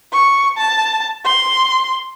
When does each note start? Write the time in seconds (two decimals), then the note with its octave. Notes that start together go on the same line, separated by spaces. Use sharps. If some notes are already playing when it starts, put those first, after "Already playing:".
0.13 C#6
0.57 A5
1.25 C6